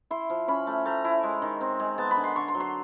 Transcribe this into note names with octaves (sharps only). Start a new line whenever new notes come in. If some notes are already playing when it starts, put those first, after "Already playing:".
E4 C6
F3
C#4 B5
A3
A3 A#5
E4
G#3
D#3
C4
G#3
B3 A5
B5
D3
C6
D3 C#6
C6
F#3
C6